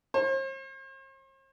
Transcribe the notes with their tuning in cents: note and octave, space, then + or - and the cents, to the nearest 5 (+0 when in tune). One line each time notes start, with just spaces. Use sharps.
C5 +45